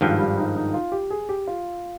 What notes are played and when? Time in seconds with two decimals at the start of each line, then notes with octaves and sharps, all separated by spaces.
0.01 G#1 G2 D#3 F3
0.19 G3
0.38 D#4
0.56 D#4
0.74 F4
0.92 G4
1.10 G#4
1.29 G4
1.47 F4